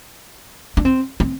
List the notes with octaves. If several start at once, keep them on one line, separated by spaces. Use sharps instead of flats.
D4
C4
C4